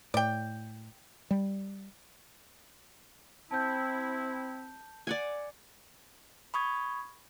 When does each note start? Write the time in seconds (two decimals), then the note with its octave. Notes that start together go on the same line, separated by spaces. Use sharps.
0.14 A2 D5 G5
1.31 G3
3.51 C4 E4 A5 G6
5.07 D5 F#5 G#5
6.54 B5 C#6 D#6 G#6